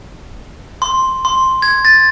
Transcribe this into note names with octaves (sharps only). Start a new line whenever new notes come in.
C6
C6
G#6
A6